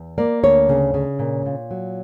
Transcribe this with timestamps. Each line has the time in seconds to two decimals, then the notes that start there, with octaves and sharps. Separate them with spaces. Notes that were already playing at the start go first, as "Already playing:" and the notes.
Already playing: E2
0.18 A#3 D5
0.43 D2 C#5
0.69 C#3
0.94 C#3
1.19 A#2
1.46 A#2
1.71 F#3